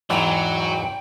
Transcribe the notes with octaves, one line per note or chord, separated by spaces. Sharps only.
E2 G#2 E3 F#3 G5